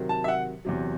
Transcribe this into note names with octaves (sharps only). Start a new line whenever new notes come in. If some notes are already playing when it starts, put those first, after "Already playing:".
Already playing: C3 D#3 F#3
A5
E5
F#5
E2 C3 F#3